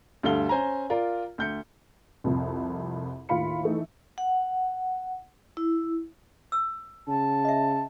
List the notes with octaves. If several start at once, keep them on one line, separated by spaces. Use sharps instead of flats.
D2 G2 D3 A4 F5 G7
C#4 C5 G#5 A#5
F4 A#4 D5
D2 G6 C#7
C2 F2
D#2 A2 F4 F5 B5 C#7
E3 A3 D#4
F#5
E4
E6
C#3 A5
D#5 E5